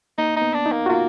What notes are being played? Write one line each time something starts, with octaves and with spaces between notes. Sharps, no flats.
A#3 D#4
D#4
B3
D4
D#4
A#3
F#4
A#3 F4